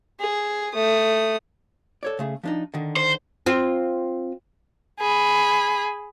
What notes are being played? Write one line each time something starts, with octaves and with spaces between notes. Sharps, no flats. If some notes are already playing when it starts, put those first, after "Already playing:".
G#4
A3 D#6
A4 C#5 D5
C#3 A3 G#4
F3 D4 D#4
D3 D#3
C5
C4 F4
G#4 B5